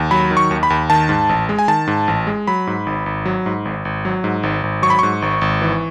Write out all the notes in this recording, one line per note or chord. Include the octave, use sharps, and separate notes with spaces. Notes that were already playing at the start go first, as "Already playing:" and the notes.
Already playing: D#2
F#3 B5
D#3
C#6
D#2
B5
D#2
D#3 A5
G#2
A1
G#3
G#5
D#3 A5
G#2
A1
G#3
F#3 B5
G#2
G#1
G#1
F#3
G#2
G#1
G#1
F#3
G#2
G#1
G#1
F#3 C#6
B5
G#2 C#6
G#1
G#1
E3